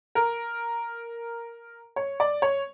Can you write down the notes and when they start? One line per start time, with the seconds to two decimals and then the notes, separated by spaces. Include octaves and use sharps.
0.15 A#4
1.96 C#5
2.20 D5
2.42 C#5